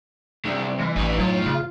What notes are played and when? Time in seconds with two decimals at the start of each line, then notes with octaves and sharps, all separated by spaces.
0.45 C2 G#3 D4
0.79 E3 G#3
0.96 A1 A2 D#4
1.18 F#3 F4
1.46 C#3